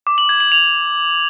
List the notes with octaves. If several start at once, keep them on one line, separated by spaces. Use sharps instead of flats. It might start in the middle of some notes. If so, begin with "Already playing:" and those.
D6
F#7
G#6
F#7
F7